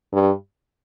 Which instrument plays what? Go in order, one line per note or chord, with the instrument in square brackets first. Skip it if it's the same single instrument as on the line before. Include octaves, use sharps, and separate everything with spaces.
[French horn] G2